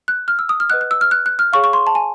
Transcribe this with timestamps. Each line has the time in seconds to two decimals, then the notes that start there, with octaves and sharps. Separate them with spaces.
0.08 F#6
0.28 F6
0.39 E6
0.49 D#6
0.60 F6
0.70 B4 D#5 F#5 F#6
0.81 F#6
0.91 E6
1.01 F6
1.11 F#6
1.26 F#6
1.39 F6
1.53 G#4 C#5 F5 C#6
1.64 C#6
1.73 C6
1.87 A5
1.95 G#5